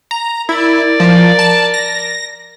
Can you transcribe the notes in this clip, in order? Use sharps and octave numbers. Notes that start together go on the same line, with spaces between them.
A#5
E4 A#4 D5
F3
A5
A#6